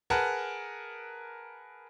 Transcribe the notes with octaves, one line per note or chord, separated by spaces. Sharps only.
G#4 A#4 B4 F#5 A5